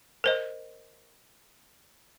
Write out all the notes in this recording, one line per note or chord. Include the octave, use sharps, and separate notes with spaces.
A#4 C5 D#5